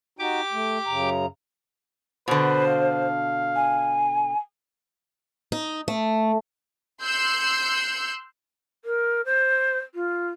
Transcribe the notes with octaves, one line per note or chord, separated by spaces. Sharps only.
D#4 F#4 G4 D6
A3
F#2 C#3 A#5
B2 D3 B4 C5
F5
G#5
D#4
A3
C6 E6 F#6 G6 C7 C#7
A#4
C5
F4